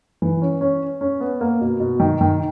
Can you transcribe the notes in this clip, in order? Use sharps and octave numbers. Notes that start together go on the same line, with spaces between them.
E3
C#4
C#4
C#4
B3
A#3
B2
B2
D#3
D#3